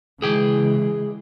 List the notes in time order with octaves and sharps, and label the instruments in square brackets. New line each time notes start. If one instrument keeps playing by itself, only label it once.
[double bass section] C#3 E3 G#3 [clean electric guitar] G#4 G5